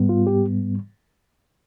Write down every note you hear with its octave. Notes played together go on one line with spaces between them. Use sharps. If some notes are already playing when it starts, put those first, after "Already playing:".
Already playing: G#2 G3 B3
F4
G4